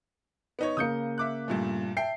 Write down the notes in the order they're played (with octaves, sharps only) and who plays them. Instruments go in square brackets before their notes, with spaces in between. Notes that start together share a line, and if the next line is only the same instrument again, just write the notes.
[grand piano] B3 D#4 C#5
[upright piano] C#3 A#3 [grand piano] D#6 G6 C#7
[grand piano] E5 D6 F#6
G2 A#2 A3
[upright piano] E5 A5 [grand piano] G5 C7